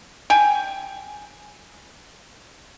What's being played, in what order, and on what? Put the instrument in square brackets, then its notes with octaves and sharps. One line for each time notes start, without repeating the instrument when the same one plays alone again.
[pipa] G5 G#5